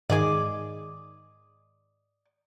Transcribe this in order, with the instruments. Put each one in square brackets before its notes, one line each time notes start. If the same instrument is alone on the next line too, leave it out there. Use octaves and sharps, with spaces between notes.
[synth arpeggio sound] G#2 D#3 G#4 [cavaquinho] D5 D#5 D6